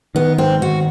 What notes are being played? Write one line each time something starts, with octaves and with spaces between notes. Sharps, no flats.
D#3 B3
G#2 C4
D#3 F#4